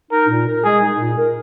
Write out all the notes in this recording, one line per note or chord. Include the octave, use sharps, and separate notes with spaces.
D#4 A#4
A#2
A#4
G#3 G#4
D#4
A#2
A#4